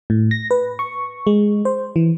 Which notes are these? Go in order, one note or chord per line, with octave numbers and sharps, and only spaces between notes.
A2
A#6
B4
C#6
G#3
C5
E3